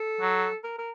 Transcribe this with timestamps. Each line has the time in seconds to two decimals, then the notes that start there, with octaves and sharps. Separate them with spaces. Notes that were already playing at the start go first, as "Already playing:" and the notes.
Already playing: A4
0.21 F#3
0.64 A#4
0.78 A#4